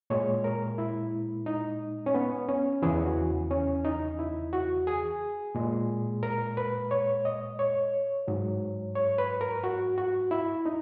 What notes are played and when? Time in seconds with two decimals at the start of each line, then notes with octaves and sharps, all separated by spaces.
0.10 A#2 G#3 C#5
0.44 A#4
0.78 E4
1.46 D#4
2.06 C#4
2.14 B3
2.48 C#4
2.82 E2 C#3 E3 G#4
3.05 F#4
3.51 C#4
3.85 D#4
4.19 E4
4.53 F#4
4.87 G#4
5.55 A#2 G#3
6.23 A#4
6.57 B4
6.91 C#5
7.25 D#5
7.59 C#5
8.28 G#2 F#3
8.95 C#5
9.18 B4
9.41 A#4
9.64 F#4
9.98 F#4
10.31 E4
10.66 D#4